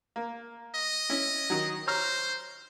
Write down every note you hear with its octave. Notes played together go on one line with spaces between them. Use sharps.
A#3
D#5
C#4 E4
D#3 F#3
C5 C#5 A#5 F6